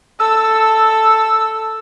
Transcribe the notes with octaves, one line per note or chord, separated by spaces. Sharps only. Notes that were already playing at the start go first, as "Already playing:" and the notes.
A4 E6